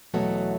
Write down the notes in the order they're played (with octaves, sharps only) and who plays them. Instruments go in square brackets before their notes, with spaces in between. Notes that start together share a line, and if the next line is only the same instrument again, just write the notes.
[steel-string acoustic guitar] E2 B2 F#3 A3 F#5